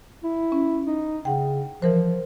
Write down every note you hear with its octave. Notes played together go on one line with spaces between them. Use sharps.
E4
C#4
D#4
C#3 F#5 G5
E3 F3 A#4 C5